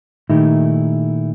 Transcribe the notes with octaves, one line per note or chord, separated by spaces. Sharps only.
A#2 D#3 A3 D#4 E4 G4